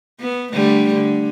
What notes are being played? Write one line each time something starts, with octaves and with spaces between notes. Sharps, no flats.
B3
D3 G3 A3
D3